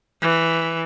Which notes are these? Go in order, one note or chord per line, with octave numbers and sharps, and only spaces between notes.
E3